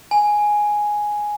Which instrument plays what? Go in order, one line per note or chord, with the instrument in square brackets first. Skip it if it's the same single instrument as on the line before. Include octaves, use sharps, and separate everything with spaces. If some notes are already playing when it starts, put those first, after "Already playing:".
[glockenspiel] G#5